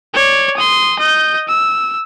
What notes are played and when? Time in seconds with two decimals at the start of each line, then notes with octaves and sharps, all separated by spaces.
0.14 C#5 D5
0.57 C6 D#6
0.99 D#5 G6
1.48 E6